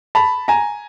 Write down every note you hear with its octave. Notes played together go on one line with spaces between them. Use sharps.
A5 B5
G#5 A#5